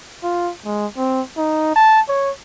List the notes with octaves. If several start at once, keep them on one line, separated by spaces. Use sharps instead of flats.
F4
G#3
C4
D#4
A5
C#5